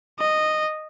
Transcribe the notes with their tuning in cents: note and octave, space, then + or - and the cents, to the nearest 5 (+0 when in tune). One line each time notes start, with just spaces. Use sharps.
D#5 -10